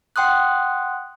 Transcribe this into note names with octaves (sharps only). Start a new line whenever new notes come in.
F#5 G5 C6 D#6 F#6